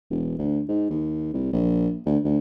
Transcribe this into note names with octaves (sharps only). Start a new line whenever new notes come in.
E1
D2
G#2
D#2
C2
A#1
D2
D2